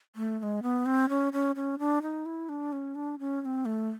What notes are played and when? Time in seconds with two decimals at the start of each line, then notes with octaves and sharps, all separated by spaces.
0.16 A3
0.39 A3
0.43 G#3
0.63 B3
0.86 C4
1.09 C#4
1.33 C#4
1.56 C#4
1.79 D4
2.02 D#4
2.26 E4
2.49 D4
2.72 C#4
2.95 D4
3.19 C#4
3.42 C#4
3.45 C4
3.65 A3